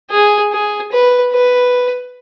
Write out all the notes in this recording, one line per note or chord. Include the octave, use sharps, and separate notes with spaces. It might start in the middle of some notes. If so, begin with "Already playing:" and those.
G#4
G#4
B4
B4